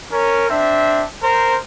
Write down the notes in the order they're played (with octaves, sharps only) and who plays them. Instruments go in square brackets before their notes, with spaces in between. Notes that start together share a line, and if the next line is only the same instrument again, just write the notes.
[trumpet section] C#4 A#4
C4 D4 E5
A#4 C5